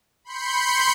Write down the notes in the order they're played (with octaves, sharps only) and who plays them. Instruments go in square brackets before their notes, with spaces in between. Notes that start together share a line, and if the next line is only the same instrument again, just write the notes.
[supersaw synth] B5 C6 G6 C#7